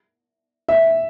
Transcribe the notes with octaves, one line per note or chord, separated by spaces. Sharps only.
E5